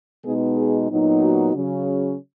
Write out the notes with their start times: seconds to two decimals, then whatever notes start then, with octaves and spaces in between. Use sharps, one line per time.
0.24 B2 G#3 B3 D#4 G#4
0.56 G#4
0.89 A#2 F#3 B3 D#4
1.21 F#4
1.53 C#3 F#3 C#4